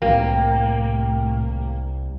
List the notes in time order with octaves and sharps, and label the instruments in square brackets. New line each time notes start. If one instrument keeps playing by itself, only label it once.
[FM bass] C2 [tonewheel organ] A2 [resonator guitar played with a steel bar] A#3 [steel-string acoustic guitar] G4